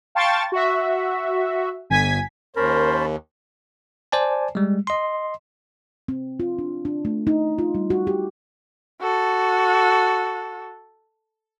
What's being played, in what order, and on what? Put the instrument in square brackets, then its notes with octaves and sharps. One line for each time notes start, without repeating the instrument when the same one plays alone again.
[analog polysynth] F5 G5 A5 C6 C#6 A6
F#4 E5
G1 G#5 G#6 B6
[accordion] D#2 [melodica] C#4 A5 B5 [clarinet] A#4 [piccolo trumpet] C5
[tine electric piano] C5 D5 G#5 A5
G3 G#3
D#5 C6
[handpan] C4
F4
D4
D4
A3
D#4
F4
G3
F#4
G4
[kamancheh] F#4 A4